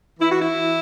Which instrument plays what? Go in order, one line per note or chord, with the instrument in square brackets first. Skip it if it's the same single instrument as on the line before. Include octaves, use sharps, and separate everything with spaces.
[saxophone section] E3 E4
F#4
E4
E3